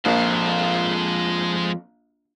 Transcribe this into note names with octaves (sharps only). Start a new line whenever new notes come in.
A#1 F2 G#3 C5